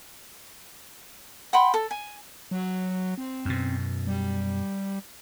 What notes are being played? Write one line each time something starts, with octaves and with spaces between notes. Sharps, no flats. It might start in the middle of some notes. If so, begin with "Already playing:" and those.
F#5 G5 B5 C6
A4
G#5
F#3
C4
F#2 B2
G3